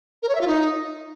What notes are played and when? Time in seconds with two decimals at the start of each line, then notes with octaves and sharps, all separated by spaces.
0.23 A#4
0.29 C#5
0.35 E5
0.41 F4
0.47 D#4